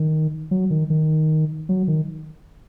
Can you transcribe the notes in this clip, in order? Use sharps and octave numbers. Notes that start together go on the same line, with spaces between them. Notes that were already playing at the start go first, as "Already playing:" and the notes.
Already playing: D#3
F#3
D#3
D#3
F#3
D#3